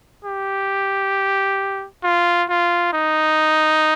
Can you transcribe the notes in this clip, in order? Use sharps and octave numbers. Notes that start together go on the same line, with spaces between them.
G4
F4
F4
D#4